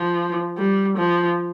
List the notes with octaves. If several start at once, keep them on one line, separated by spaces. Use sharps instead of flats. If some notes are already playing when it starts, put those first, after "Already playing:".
Already playing: F3
G3
F3